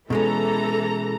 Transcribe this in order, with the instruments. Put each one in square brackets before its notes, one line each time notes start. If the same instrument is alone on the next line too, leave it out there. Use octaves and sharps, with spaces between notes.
[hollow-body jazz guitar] B2 G#3 C#4 [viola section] E3 A4 A#5